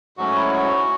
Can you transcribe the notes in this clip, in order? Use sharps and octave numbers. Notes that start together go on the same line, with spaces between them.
G#2 F#3 A3 C#4 F#4
E4
F#4